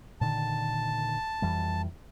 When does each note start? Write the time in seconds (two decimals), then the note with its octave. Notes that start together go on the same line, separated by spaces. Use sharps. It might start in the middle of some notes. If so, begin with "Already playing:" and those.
0.21 A#2 D3 D#3 A5
1.42 F2 E3 G3